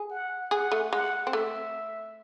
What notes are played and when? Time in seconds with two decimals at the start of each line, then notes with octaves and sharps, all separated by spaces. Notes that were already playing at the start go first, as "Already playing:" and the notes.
Already playing: G#4
0.10 F#5
0.51 G#4 F#5
0.72 A3
0.92 G#3 F#5
1.27 C4
1.33 A3 E5